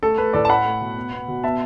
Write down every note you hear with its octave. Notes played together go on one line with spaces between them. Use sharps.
A3 A4
A3 B4
A2 A4 D5
A5
A3 F#5 B5
A3
B2
B3
B3
B2
B3 E5 A5